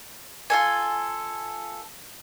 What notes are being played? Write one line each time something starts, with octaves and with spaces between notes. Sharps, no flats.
F4 A4 G#5